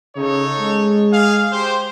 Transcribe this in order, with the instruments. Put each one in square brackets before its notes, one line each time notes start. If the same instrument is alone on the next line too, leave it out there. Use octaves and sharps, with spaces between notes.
[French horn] C#3 [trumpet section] D#4 A4 C#5
[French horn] G#3
[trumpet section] G#4 F5
G4 C5